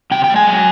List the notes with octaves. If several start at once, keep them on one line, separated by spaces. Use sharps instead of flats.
C3 G5
G5
G#3
G#5
F#3